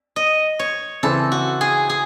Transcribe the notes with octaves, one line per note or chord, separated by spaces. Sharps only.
D#5
C#5
C#3 E3 C4 A4
F#4
G#4
G#4